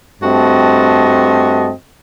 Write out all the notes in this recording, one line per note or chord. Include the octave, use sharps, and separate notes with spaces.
G2 A3 C4 F#4 D#5 A5